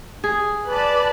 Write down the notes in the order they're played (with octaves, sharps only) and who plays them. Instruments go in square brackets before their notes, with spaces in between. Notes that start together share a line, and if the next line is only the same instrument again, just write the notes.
[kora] G#4
[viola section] B4 D5 A5